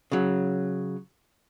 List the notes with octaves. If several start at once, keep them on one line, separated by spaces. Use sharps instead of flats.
C#3 F#3